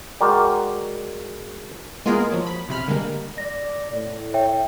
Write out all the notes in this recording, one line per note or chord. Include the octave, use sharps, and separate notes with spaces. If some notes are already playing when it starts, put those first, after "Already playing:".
G#3 F#4 A#4 D5 G5
G#3 A#3 B3 F4 G#4 A#4
F3 F#3
B5
B1 C3 B5 F6
D3 G3 G#3 A#3
D5 A#6
A2
C#5 E5 G5